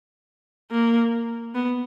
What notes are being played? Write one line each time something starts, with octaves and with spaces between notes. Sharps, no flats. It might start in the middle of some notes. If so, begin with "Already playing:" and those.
A#3
B3